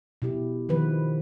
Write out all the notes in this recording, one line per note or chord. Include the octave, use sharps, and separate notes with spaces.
B2 E4 G4
D#3 F3 B4